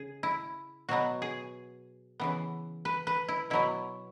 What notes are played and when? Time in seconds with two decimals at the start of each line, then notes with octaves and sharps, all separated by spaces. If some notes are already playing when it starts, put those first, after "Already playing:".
Already playing: C#3 G#4
0.23 E4
0.89 B2 F#3 B3 F#4
1.22 G#4
2.20 C#3 E3 B3
2.85 B4
3.07 B4
3.28 E4
3.50 B2 F#3 B3 E4